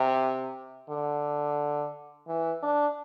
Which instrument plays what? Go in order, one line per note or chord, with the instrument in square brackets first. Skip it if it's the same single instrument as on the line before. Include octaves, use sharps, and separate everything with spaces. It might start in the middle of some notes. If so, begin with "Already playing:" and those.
Already playing: [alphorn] C3
D3
E3
D4